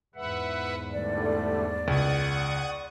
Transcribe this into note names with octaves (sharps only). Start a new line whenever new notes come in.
E2 G#2 B4 E5 F#5
D3 G3 A3 D5
C#2 F#5 C#6 D#6